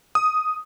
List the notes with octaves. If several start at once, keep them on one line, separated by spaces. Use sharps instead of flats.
D#6